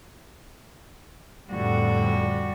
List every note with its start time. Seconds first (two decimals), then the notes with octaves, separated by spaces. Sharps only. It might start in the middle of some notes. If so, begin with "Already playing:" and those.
1.50 F2 A2 D3 G3 F#4